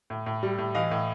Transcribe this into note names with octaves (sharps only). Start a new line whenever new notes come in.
A2
A2
G3
A2
E3 D#5 F5
A2